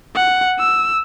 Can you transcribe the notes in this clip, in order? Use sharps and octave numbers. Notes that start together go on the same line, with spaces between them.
F#5
E6